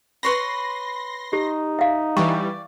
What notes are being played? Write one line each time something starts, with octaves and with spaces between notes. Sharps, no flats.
B4 C#5 B5 C6 A#6
D#4 G4
E5 F5
E3 G3 D5 C#6